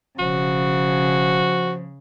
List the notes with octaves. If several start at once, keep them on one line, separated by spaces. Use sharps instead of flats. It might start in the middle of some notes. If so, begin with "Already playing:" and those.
E1 C#3 F3 F#4